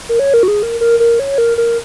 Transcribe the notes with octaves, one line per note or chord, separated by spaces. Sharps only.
A#4
C#5
A#4
F#4
G#4
A#4
A#4
A#4
C#5
A#4
A#4